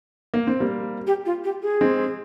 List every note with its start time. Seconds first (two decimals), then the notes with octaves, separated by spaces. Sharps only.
0.34 A#3
0.47 C4
0.60 G3 A#3
1.07 G4
1.26 F4
1.44 G4
1.62 G#4
1.81 G#3 C4